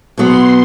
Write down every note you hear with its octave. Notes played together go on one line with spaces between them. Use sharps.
B2 F#3 B3 C6